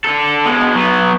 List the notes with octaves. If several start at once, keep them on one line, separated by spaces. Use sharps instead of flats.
D3 A4
B2 G#3
F#3 B3